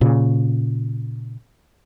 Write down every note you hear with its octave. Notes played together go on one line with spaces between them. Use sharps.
A#2 C#3